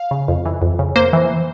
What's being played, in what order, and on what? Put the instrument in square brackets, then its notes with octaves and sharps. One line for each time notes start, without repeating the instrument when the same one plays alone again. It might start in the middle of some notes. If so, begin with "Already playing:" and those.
Already playing: [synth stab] F5
C#3
F2
E3
F2
C#3
A#3 C5
E3